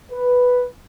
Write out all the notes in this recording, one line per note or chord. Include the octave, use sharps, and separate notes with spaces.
B4